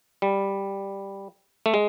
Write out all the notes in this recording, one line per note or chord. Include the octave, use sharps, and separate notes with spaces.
G3
A3
G#3